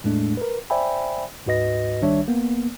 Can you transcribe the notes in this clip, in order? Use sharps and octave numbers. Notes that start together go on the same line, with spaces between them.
E2 A2 G#3 A3 D4
A#4 B4
C5 D5 E5 G5 G#5 B5
D2 G#2 F#4 B4 D#5 A#6
C2 D#3 G3 D4 C#5 E5
G1 A#3 B3